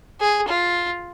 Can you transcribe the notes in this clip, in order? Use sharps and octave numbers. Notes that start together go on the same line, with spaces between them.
G#4
F4